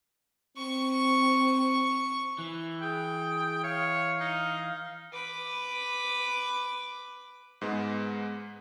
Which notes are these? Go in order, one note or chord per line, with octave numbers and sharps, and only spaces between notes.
C4 C#6
E3
G#4 G5
C#5 F5
D#4
B4 D6
G#2 G#3 B3